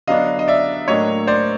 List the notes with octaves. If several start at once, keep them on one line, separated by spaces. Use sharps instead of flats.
D3 F#3 B3 D4 D#5 F5
D#5
D5 E5
A2 F#3 A#3 D4 C#5 D#5
C5 D5